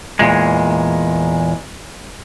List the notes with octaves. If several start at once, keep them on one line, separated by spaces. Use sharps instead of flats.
E2 A#2 G#3